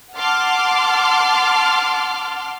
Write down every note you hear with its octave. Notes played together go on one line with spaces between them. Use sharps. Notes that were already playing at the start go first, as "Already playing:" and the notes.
F#5 A5 C6 D6 F6